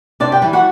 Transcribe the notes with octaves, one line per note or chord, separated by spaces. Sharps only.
C3 D4 D5
G4 G5
E3 G3
F#4 F#5